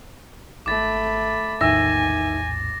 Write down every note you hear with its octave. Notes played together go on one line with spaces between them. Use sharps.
G#1 A3 B5 D6 A6
A#1 E2 A2 D#3 E5 G#5 E6 A#6